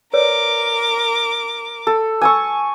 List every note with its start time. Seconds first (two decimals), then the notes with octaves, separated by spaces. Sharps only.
0.13 A#4 B4 C#5 D5 D6
1.87 A4
2.21 G#5 A5 C#6 D6 E6